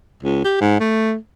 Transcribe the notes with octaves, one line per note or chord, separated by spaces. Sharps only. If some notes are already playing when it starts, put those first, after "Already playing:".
C#2
G4
G#2
A3